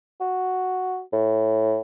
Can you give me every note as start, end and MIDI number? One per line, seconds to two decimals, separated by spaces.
0.21 1.01 66
1.13 1.80 45